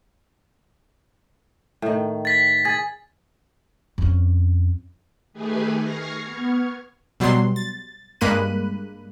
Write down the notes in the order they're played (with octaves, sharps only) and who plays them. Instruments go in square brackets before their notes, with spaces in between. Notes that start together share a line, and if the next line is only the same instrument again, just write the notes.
[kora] A2 D#3
[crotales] A6 B6
[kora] G#4 [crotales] A6
[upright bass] F2 C#4
[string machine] D#3 A3 G4 G#4 B4 G#5
C#6 F6 G#6 A#6 C7
B3 C#6 F6 G#6
[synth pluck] B2 F#3 G3 C6
A6
G2 G#3 A#3 B5 F#6 D#7